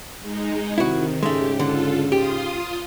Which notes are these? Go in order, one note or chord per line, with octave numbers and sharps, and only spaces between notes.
G#3 D#4
C3 D#3 C4 E4 F#4
G#2 C#3 G#3 A3 C#4 G4
D3 F4 A4
F4 G4 C6 D#6